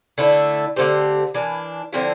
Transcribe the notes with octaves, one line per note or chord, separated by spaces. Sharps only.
D3 A3 E4
D3 A3 C4 G4
E3 A#3 D4
D3 F3 C4 E4